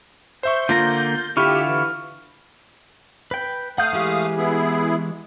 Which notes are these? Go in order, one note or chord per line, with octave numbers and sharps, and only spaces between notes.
C5 E5 C#6 G6
D3 A#3 F4 A#5
D3 E4 F4 G4 B5 C#6 F6
E3
B4 G5
A3 F5 F#5 D#6 G6
E3 G#3 G4
B3 E4 G#4